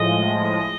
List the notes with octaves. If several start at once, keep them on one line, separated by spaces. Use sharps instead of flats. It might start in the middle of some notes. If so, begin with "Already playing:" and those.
Already playing: A2 F3 G#3 D#5